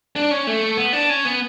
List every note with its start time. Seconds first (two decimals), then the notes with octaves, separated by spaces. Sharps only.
0.16 D4
0.31 C#4
0.47 A3
0.77 B3
0.93 D4
1.10 C#4
1.25 B3